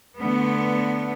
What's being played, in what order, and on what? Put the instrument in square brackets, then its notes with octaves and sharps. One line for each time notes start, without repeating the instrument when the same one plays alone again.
[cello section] D3 A3 B3